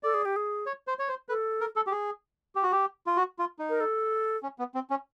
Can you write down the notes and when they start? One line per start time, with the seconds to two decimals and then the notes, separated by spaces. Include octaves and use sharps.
0.03 A4 D5
0.14 G#4
0.25 G4
0.36 G#4
0.66 C#5
0.87 C5
0.99 C#5
1.08 C5
1.29 A4 B4
1.60 A#4
1.76 A4
1.87 G4
1.92 G#4
2.55 G4
2.63 F#4
2.72 G4
3.07 F4
3.17 F#4
3.39 F4
3.59 D#4
3.69 A#4
3.80 A4
4.43 C#4
4.59 B3
4.75 C4
4.90 C#4